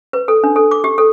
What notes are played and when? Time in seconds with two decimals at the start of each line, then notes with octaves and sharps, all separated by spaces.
0.13 B4
0.28 A4
0.44 D4
0.56 A4
0.71 D6
0.84 G4
0.98 A4